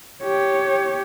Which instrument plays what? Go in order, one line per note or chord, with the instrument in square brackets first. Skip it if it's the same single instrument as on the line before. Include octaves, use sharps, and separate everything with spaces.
[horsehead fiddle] G4 C#5